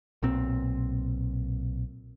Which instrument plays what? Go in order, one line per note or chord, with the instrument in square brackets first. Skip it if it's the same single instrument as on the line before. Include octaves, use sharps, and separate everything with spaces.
[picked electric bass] B1 A#2 C4